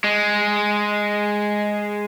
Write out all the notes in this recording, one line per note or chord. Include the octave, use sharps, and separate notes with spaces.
G#3